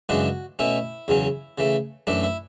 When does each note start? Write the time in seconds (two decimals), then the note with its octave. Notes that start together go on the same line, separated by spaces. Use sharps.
0.09 F#2 C#3 E3 G#3 D4 F#4
0.59 B2 A3 C#4 E4
1.08 E2 C#3 F#3 C#4
1.58 C#3 E3 A3
2.07 F#2 E3 A3 D4
2.23 E4